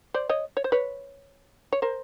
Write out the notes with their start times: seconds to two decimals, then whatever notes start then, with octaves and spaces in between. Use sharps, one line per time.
0.14 C5 D5
0.29 C#5 D#5
0.57 C#5
0.64 C5
0.72 B4 C#5
1.72 C#5
1.82 A#4 C5